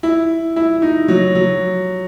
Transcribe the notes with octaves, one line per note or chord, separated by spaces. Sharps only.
E4
E4
D#4
F#3
F#3